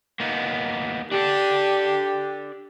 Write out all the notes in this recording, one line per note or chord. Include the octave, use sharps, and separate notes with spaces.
A#3 B3 D#4
D4 G4 A4 D5